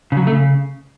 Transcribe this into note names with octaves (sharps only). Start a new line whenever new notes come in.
C#3
F#3
C#3
A3
C#3